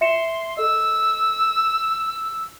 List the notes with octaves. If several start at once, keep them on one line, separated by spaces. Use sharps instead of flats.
E5 C6 C#7 E7
A4 D#5 E6